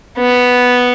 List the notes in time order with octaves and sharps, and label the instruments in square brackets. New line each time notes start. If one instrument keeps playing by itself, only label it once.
[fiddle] B3